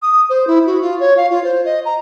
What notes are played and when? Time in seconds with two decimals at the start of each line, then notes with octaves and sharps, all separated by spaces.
0.02 D#6
0.29 C5
0.47 E4
0.66 F#4
0.82 F4
1.00 C#5
1.17 F5
1.30 F4
1.44 C5
1.65 D#5
1.85 A#5